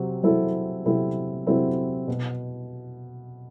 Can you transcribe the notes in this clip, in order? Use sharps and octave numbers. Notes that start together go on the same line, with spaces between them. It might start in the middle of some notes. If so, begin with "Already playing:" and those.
Already playing: C3 F#3 C4
C3 F#3 C4 E4 A4
C3 F#3 C4 E4 A4
C3 F#3 C4 E4 A4
B2